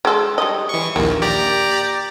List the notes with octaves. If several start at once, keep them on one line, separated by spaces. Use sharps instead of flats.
G#3 A4
G3 D#5
E3 C#6
A#1 D#2 A#3
G4 D5 A#5